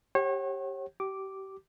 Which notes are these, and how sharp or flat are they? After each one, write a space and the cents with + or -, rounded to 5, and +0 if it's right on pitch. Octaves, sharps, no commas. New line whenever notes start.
G4 +0 C#5 -35 F#5 +35
G4 -30 D6 -5